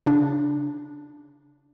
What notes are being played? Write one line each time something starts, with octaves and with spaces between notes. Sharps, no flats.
C#3 D4